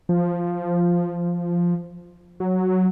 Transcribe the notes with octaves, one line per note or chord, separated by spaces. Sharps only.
F3
F#3